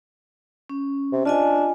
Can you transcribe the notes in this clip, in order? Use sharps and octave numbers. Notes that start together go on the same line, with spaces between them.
C#4
C3
D4 F4 D#5 G#5